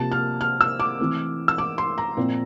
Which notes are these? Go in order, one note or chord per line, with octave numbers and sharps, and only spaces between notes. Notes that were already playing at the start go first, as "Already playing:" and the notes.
Already playing: C3 F3 A#3 A5
F6
F6
E6
D6
E3 A3 C4
E6
D6
C6
A#5
A#2 F3 C4